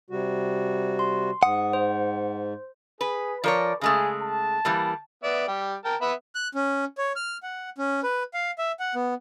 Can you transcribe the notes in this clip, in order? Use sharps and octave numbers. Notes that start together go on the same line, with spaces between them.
C3 G3 F#4
C6
G#2 F#5 D#6
C5
G#4 B4
F3 A#4 C#5 D5
C#3 G#3 A3 G#4
A5
E3 G3 A#3
B3 D5 E5
G3 G4
A#4 G5 A5
B3 E5 B5
F#6
C#4
C#5
F6
F#5
C#4
B4
F5
E5
F#5
B3